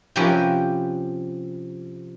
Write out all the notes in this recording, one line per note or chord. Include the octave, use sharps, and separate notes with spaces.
C3 F3 C#4 G4 A#4 B4